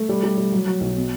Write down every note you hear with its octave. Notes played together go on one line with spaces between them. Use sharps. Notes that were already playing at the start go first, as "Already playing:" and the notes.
Already playing: A3
G3
G3
G3
F#3
F#3
B1
B2